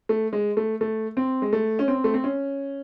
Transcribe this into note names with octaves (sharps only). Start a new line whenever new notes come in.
A3
G#3
A3
A3
C4
G#3
A3
C#4
C4
A3
C4
C#4